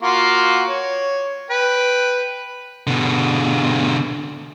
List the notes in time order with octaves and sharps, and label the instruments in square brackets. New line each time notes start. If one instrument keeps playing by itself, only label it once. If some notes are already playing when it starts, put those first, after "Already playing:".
[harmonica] A#3 F4 F#4
C#5
B4 G5
[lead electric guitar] B2 D3